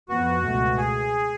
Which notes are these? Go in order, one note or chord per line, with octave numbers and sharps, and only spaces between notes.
F2 F3 B3 F#4
C#2 B2 A3
G#4